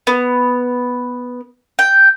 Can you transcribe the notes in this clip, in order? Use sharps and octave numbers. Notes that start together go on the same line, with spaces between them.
B3
G5